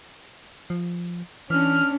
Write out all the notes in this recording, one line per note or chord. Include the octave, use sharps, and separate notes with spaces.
F3
E3 C#4 D4 F6